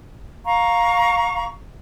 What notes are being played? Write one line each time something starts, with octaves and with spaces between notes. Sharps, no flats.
F5 A#5 C#6